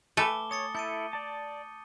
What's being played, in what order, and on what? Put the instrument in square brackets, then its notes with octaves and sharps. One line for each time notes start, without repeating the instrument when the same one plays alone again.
[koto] A3 B4 [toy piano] G#5 B5 [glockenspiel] A5 D6 G7
[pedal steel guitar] C#5 [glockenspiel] D#6 A6 C#7
[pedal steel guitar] E4 A4 [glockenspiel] G6 C#7 D#7
[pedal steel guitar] D5 A5